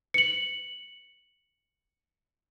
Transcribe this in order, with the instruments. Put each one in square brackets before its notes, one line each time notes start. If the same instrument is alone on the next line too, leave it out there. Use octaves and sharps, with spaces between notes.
[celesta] C#7 F#7